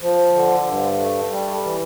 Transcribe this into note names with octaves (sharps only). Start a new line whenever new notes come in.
F3
D3
G2
A3
G3
E3